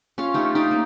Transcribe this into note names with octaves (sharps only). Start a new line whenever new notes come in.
C#4 F4 F5
A3 D#4 G4
D#4 G4 D5 F5
A#3